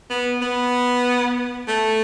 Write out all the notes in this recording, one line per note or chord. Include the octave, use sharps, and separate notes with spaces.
B3
B3
A3